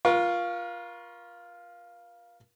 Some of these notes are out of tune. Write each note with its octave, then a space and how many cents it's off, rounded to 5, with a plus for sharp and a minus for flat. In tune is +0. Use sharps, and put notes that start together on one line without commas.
F4 +0 A#4 +40 C#6 +0